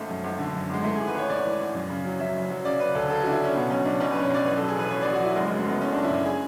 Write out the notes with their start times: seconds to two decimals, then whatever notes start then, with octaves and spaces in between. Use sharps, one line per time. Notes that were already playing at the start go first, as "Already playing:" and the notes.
Already playing: G#1 A3
0.09 F#2
0.24 G#1
0.39 D3
0.55 F#2
0.69 G#1 G#3
0.84 E3 A3
0.95 G#4
1.00 G#1
1.07 B4
1.14 G#1 C#5
1.29 G#1 D5
1.44 E3
1.60 G#1
1.74 F#2
1.90 C#3
2.05 F#3
2.20 F#3 E5
2.35 F#1
2.50 F#3
2.65 C#3 D5
2.80 C#3 B4
2.95 D2 A4
3.10 C#3 A4
3.21 F#4
3.26 E3 D4
3.32 E4
3.40 C#3 C#4
3.55 B2 B3
3.70 B1 C#4
3.85 B1 D4
4.00 B1 C#4
4.11 B4
4.16 B2
4.23 C#5
4.30 B1 D5
4.45 A1 B4
4.57 A4
4.60 F#3
4.68 G#4
4.75 A1 B4
4.86 B4
4.90 A1 C#5
5.02 D5
5.05 A1
5.13 F#4
5.20 F#3 E4
5.35 F#1 G#3
5.47 G#3
5.51 F#1
5.59 A3
5.66 F#1 B3
5.81 F#1 C#4
5.92 D4
5.96 F#1
6.03 E4
6.11 F#2
6.26 G#4